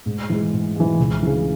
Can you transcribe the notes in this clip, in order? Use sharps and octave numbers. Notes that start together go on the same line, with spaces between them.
G#2
E3 G#3
G#2
E3 G#3
C#2
C#3 E3